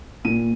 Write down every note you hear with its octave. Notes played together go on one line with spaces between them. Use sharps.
A#2 D#7